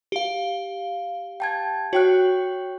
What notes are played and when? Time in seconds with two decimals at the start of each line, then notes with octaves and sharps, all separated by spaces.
0.12 G4 F5
1.40 G5 A5 G#6
1.93 F#4 C#5 G5 F#6